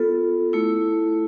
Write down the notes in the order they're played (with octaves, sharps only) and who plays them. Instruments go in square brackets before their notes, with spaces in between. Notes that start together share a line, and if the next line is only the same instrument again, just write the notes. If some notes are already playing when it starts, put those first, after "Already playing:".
Already playing: [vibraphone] B3 F4 A4
A3 E4